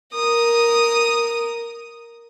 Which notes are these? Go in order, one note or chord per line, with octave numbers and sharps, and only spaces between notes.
A#4 D#6